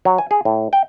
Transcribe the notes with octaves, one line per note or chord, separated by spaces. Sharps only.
F#3
G#5
G#4
A2
G5